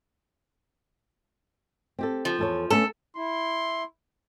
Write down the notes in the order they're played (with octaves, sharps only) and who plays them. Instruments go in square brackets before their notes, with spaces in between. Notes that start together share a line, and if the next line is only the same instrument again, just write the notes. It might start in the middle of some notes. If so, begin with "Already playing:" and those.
[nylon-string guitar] C4 G4 A4
[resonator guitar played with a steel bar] F3
[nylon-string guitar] E2 A4 C#5
[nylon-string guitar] A3 B3 C#4 [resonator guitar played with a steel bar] A4
[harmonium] E4 [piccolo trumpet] C6